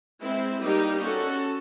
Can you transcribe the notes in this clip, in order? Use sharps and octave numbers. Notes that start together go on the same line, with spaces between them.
G#3 C4 E4
G3 A#3 D#4 G4
C#4 F#4 A4